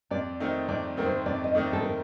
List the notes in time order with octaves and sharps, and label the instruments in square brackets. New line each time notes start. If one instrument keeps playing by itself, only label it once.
[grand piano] F2 [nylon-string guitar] D5
[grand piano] D#3 A3 C4 D#4
[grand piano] F2 [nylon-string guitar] D5
[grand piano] D#3 A3 C4 D#4 [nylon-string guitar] A#4
[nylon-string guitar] C5
[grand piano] F2 [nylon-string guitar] D5
[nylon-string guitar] D#5
[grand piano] D#3 A3 C4 D#4 [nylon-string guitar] D5
[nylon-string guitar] A4
A#4